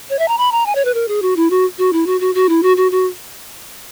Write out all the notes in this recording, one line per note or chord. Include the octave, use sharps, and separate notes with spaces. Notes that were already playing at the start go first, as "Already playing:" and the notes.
C#5
E5
A#5
B5
A#5
G#5
C#5
B4
A#4
G#4
F#4
E4
F#4
F#4
E4
F#4
F#4
F#4
E4
F#4
F#4
F#4